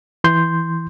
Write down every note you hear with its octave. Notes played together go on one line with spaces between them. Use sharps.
E3 C6 G6